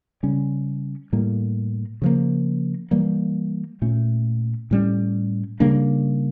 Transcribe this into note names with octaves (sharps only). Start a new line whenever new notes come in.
C#3 G3 C#4
A2 G3 A#3
C#3 F3 A#3
E3 G3 A#3
A#2 A3 C#4
A2 G3 C#4
C#3 G3 A#3 D4